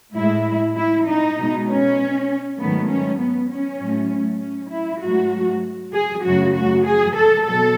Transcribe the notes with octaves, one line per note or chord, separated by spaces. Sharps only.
A2 G#3 E4
E4
D#4
B2 G#3
C#4
G#2 D#3 F#3 A3 B3
C#4
B3
C#4
A2 F#3 A3
C#4
E4
G#2 F#3 A3 F#4
G#4
F#2 C#3 F#3 A3 F#4
F#4
G#4
A4
B2 F#3 A4